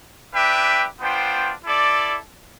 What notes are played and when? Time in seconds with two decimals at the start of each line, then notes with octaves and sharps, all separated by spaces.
0.33 D4 G4 B4 E5 G5
1.00 B3 D4 F4 C5 G5
1.64 E4 A4 D5